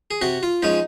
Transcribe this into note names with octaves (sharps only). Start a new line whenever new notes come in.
G#4
C3 F#4
F4
F3 G#3 C#4 D#4